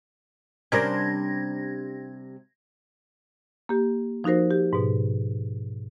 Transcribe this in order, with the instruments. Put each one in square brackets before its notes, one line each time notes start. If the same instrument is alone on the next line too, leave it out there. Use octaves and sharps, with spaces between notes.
[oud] C3 G3 D4 [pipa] C#4 A#4 C5 [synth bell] G#6 A#6
[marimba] A#3 G4
F3 D#4 F#4 A#4 C5
G4
G#2 B2